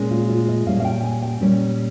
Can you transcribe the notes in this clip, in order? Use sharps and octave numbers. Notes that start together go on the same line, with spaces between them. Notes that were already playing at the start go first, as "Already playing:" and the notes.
Already playing: A#2 G#3 C#4
F4
F4
D#5
A#2 G3 C#4 F5
F5
G5
G#5
G5
A#2 G3 C#4